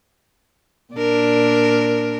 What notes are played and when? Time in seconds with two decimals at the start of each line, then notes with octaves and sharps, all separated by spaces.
0.94 A#2 D4 A#4